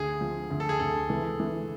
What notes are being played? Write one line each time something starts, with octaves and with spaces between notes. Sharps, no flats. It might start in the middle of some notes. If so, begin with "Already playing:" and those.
Already playing: D2 G#4
F3
D2
A4
G#4
D2 A4
E3
E3